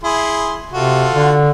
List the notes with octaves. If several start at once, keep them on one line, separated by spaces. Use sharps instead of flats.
E4 G#4 C6
C3 F4 F#4 A4
D3